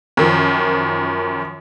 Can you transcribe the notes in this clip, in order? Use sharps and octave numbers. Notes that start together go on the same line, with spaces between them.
F#2 D#3 F3